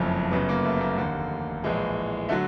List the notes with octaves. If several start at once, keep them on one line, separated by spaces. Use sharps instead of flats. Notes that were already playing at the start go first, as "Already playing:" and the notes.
Already playing: F#1 F2 C#3 F3 A3 C#4
G1 F#2 C#3 B3
A#3
A3
A#3
F1 D#2 D3 A#3
A#1 A2 E3 G#3
D3 F#3 A3